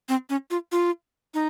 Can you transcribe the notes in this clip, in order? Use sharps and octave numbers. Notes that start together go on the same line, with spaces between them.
C4
C#4
F4
F4
D#4